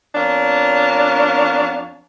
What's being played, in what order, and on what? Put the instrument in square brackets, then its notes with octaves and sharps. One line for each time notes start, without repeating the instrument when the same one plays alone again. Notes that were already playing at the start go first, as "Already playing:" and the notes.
[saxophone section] F2 B3 D4 A#4 C#5 F5